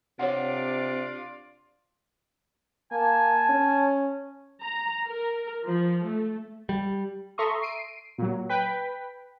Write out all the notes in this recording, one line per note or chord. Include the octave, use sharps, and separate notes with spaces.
C3 D4 F4 C#5 D5 F#5
A#3 G#5 A5
C#4
A#5
A#4
F3
A3
G3
A4 E5 A#5 C6 C#6 D#6
C7 D7 D#7
A#2 F#3
B4 G5 B6